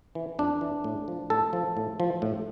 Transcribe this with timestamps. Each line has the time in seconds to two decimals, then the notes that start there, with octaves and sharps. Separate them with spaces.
0.15 E3
0.39 F2 D4
0.61 E3
0.84 A2
1.08 F3
1.30 A2 A4
1.53 F3
1.77 A2
2.00 F3
2.22 A2